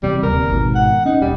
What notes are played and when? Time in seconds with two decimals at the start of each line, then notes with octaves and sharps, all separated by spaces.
0.03 E2 C3 G3
0.23 D1 D#2 C3 A#4
0.49 G#1 G#2 B2
0.75 F#5
1.05 C#4 D#4
1.21 D#1 G3